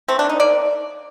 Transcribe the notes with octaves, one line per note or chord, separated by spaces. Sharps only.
A3 C4
D4
D#3
D#4
A#3 D5